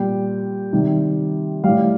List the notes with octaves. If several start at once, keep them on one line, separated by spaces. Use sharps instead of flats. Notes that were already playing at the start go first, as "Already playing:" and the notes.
Already playing: A#2 G3 G5
C3 D#3 G3
A2 G3 F5